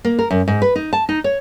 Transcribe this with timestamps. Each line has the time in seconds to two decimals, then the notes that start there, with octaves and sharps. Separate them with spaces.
0.05 A#3
0.19 A#4
0.31 F#2
0.48 G#2
0.62 B4
0.76 D#4
0.93 A5
1.09 D#4
1.24 C#5